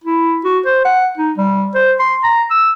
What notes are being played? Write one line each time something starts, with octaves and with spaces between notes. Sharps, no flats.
E4
F#4
C5
F#5
D#4
G3
C5
C6
A#5
E6